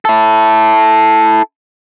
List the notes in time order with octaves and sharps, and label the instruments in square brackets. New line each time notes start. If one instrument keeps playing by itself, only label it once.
[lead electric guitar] E4 A4